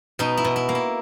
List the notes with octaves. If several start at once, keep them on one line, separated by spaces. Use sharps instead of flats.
B2 D#4
E4
B2
E4
A#3
E4